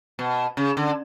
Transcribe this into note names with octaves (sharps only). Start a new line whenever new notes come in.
B2
C#3
D3